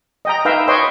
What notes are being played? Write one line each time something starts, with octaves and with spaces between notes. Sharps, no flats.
D#5 G5 A#5
D#4 B4 E5 F5 G5
B4 C#5 D#5 G5 C6